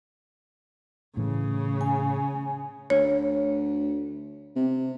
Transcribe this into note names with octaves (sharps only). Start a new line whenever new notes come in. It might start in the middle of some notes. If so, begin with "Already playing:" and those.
A2 C#3 E3
G#5
D2 C#5
C3